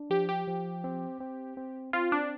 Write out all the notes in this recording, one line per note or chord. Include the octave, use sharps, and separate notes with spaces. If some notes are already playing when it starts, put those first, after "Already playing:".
Already playing: D4
F3 G4
G4
F3
C4
C4
C4
C4 F4
D4